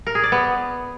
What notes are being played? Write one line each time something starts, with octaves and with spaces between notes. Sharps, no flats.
A#4
G#4
D5
B3